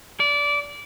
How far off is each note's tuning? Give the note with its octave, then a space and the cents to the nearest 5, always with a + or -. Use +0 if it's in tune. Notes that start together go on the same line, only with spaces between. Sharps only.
D5 -20